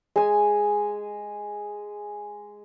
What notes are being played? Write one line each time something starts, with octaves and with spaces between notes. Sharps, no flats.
G#3 G#5